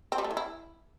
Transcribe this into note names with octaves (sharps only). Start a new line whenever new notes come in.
C4
G3
A3
E3
E4